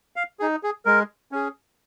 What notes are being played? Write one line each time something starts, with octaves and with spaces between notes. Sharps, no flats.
F5
D#4 G#4
G#4
G#3 A#4
C#4 G#4